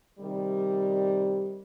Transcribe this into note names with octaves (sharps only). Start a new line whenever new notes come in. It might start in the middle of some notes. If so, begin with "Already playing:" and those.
C3 D#3 G3